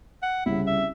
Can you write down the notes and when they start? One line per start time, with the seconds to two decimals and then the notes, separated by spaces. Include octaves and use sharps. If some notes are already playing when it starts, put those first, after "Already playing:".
0.23 F#5
0.46 C2 C#3 E4
0.67 E5